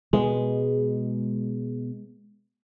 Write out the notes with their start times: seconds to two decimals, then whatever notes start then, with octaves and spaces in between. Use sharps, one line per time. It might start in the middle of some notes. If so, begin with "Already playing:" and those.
0.13 B2 G#3